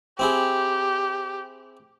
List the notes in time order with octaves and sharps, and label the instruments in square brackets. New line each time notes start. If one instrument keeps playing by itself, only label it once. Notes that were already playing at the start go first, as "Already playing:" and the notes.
[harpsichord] C4 E4 G#4 [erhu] G4